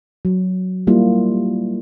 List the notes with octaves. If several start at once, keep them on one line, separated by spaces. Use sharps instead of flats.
F#3
G3 A#3 E4 F4